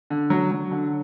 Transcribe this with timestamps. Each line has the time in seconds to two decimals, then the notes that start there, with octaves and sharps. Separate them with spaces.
0.10 D3
0.30 F#3
0.52 F#3
0.71 D3